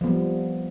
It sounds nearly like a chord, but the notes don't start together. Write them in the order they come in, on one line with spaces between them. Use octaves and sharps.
F3 B3 G3